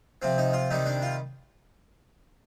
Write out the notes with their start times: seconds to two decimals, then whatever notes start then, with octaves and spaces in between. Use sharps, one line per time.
0.22 C3 F3 C4
0.38 D#4
0.53 F4
0.71 C3 D#3 G3 D#4
0.86 D4
1.02 F4